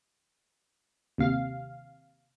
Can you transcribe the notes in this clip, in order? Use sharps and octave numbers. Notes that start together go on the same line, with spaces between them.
D#2 C3 F5